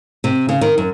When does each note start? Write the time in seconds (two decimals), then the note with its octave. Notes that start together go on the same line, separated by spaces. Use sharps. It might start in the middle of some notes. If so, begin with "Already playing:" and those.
0.24 C3
0.49 C#3
0.61 D#3
0.78 F#2